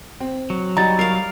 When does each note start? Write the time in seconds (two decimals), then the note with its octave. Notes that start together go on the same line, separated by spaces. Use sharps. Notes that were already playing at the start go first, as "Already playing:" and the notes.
0.20 C4
0.50 F#3
0.77 G3 D#4 F#4 G#5 A#5 A6
0.99 A#4 F5 C7